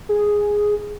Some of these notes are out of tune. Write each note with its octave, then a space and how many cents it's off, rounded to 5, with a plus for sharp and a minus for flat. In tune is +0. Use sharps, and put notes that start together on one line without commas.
G#4 +0